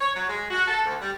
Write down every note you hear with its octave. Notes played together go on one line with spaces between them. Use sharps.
C#5
F#3
G#3
F#4
A4
D2
G3